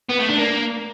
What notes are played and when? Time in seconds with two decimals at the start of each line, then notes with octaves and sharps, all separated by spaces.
0.09 B3
0.19 A3
0.29 D4
0.38 A#3